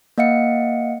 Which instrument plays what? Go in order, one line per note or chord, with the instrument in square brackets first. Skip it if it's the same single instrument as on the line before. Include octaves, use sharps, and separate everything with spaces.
[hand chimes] A#3 D#5 F5 F#5 C#7